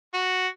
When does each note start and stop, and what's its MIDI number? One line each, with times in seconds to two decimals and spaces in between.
0.14 0.47 66